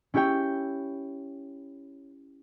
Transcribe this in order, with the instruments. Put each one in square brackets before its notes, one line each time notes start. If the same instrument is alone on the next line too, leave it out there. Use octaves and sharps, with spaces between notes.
[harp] C#4 E4 G4 C#5 G5